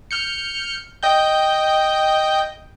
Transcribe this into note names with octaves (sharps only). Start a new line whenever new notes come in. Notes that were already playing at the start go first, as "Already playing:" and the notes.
F6 G6 C#7
D#5 G5 G6